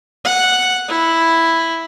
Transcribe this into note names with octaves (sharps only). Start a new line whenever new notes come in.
F#5
E4